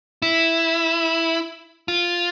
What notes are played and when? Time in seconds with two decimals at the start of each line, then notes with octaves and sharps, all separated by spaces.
0.22 E4
1.88 F4